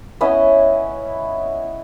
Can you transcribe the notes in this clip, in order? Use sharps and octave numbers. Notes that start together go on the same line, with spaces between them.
B3 C#4 E4 D#5